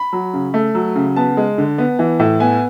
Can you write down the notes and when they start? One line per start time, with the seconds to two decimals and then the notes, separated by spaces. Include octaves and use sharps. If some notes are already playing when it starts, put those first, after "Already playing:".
Already playing: B5
0.13 F#3
0.34 C#3
0.54 A3
0.75 F#3
0.95 C#3
1.16 B3 A5
1.37 G#3
1.58 D3
1.78 B3
1.99 E3
2.19 A2
2.40 B3 G#5